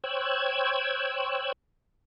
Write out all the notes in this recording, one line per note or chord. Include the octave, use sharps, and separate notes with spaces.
C5 C#5 G5 E6 F#6 G#6